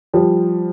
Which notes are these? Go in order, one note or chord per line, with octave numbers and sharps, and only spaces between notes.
F3 G3